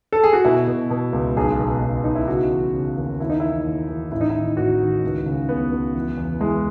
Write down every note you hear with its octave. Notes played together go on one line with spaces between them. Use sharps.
A4
G#4
F#4
B2 E4
B2
B2
C#2
B1 G#4
B2
B1
B2 D#4
E4
C#3 F#4
E3
C#3
D#2
D#2 E4
D#4
E3 E4
D#2
E3
A1 E4
D#4
E4
D#3
A1 F#4
D#3
C#2
C#3
C#2 B3
C#2
E3
E2
E3 G#3